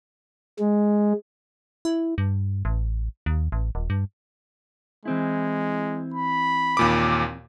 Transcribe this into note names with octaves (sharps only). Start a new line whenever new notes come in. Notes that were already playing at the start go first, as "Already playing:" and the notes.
G#3
E4
G2
A1
D#2
A1
D#1
G2
E3 G#3 C4 E4
B5
D#2 A#2 D6